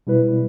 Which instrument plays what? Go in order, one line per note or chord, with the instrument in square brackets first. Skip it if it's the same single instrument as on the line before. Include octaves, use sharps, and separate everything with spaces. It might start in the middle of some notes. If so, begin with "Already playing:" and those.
[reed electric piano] B2 G3 E4 B4